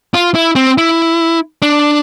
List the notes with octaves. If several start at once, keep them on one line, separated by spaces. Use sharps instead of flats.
F4
E4
C4
E4
D4